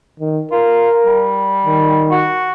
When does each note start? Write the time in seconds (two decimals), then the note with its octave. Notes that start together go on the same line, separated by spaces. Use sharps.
0.20 D#3
0.52 F4 A#4
1.06 G3
1.65 D#3
2.11 F#4